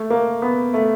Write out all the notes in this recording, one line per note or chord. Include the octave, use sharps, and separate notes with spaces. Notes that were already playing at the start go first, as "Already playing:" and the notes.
Already playing: A3
A#3
B3
A3